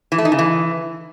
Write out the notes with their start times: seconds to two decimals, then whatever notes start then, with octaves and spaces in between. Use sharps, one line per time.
0.12 E3
0.18 A3
0.25 D#4
0.32 C#3
0.39 E3